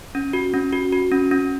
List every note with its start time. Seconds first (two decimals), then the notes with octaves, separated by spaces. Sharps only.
0.15 C#4
0.33 F#4
0.54 C#4
0.72 F#4
0.92 F#4
1.12 C#4
1.31 C#4